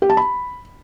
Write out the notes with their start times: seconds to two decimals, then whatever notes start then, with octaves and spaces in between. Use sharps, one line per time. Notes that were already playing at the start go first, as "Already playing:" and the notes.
0.02 G4
0.10 A5
0.17 B5